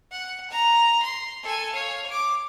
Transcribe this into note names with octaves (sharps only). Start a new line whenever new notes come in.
F#5
A#5
C6
A4 G#5
C#5 F5
D6